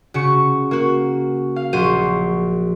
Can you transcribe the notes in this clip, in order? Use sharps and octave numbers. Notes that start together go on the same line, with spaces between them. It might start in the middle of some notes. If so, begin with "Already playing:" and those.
C#3 F#4 C#6 C#7
A#3 F#4
F5
A#1 F#3 F#4 C5 D#7